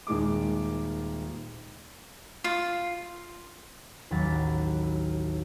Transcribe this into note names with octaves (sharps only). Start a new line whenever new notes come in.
D#1 D#3 G#3 D6
F4
A1 D#2 F#3 B5 A6